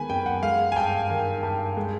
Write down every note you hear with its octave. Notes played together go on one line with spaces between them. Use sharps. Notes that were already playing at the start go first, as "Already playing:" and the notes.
Already playing: D#3 G#3 B3 G#5 B5
F#2 G5
F#5
G#3 F5
G#5
G2 G5
D#3
G2
G#3